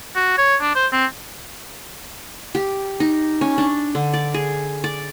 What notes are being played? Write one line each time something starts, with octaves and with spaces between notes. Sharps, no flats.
F#4
C#5
D4
C5
C4
G4
D#4
C#4
D4
D3
D5
G#4
D5